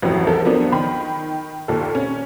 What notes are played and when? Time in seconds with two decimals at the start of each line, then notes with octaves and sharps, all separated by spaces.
0.02 A1 F2 A2 F3 F#3
0.27 E2 A4 A#4
0.45 F3 F#3 B3 D4
0.72 D#3 B5
1.68 D#2 A#2 A4
1.95 C#4